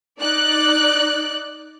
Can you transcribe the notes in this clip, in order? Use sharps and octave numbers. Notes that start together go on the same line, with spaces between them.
D#4 D5 F#6